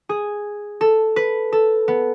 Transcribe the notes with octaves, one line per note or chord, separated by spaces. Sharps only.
G#4
A4
B4
A4
B3